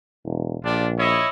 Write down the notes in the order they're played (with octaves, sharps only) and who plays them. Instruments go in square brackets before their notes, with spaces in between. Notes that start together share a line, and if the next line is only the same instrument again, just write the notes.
[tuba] E1
[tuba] A#1 [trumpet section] D4 F4 G4
[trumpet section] E4 C#5 D#5